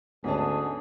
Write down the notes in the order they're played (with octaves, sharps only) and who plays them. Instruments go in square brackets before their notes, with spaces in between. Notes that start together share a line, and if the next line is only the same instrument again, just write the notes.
[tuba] D2 [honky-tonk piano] G#2 D#5 A5 [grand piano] B3 C#4 [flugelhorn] G#4